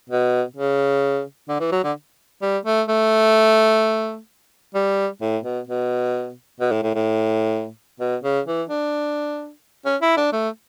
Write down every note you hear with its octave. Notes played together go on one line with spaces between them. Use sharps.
B2
C#3
D3
E3
F#3
D3
G3
A3
A3
G3
A2
B2
B2
B2
A2
A2
A2
B2
C#3
E3
D4
C#4
E4
D4
A3